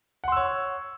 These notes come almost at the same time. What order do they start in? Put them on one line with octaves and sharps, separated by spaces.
F#5 C6 E6 C#5